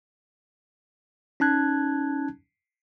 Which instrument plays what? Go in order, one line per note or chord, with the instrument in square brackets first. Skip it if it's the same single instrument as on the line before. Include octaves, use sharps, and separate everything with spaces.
[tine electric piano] C#4 D#4 A5 F#6 G#6